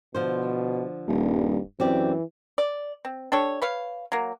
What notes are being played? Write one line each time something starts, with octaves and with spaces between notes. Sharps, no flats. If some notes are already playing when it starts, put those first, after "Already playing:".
B2 D3 F3 C5
D#1 G2
F#2 E3 C4 G4 D5
D5
C4
D4 G4 A4 C#5
B4 C#5 F5
F#3 A#3